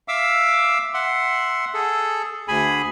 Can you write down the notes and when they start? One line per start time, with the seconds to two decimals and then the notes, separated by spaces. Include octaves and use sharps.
0.08 E5 F5 D6 E6
0.94 E5 F#5 C6
1.74 G#4 A4
2.48 D2 G#4 G#5 B5